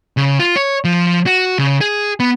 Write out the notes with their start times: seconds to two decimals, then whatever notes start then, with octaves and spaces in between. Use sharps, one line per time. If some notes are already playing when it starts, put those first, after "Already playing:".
0.17 C#3
0.40 F4
0.56 C#5
0.84 F3
1.26 F#4
1.59 C#3
1.81 G#4
2.20 B3